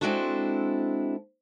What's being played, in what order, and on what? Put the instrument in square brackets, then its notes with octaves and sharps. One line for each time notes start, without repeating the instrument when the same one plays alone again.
[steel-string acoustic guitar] G#3 C4 D4 E4 F#4 A4